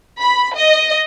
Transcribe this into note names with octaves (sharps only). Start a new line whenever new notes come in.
B5
D#5